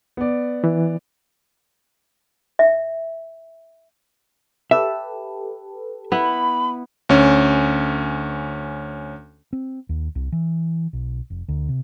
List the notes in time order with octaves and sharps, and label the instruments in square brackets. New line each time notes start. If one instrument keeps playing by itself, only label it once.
[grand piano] B3 D5
[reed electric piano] E3
[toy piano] E5
[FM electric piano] G4 A4 B4 [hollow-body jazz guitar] E5
[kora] B3 E4 [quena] B5
[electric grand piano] D2 C#4
[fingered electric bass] C4
D#2
C2
E3
B1
F1
D2
C3